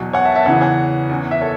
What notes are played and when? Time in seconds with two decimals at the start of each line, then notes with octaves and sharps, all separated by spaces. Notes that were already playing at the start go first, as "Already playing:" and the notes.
Already playing: E2 B2 F#3
0.13 C#5 F#5
0.24 E5 A5
0.35 E5 A5
0.46 E2 C#3 E3 C#5 F#5
0.61 C#5 F#5
1.10 E2 E3
1.31 E5
1.41 A4 C#5